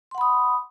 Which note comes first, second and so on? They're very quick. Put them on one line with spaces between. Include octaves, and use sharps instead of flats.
C6 F#5 B5 D#6